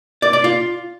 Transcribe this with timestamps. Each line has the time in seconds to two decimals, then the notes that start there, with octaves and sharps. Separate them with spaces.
0.22 D5
0.33 D5
0.44 F4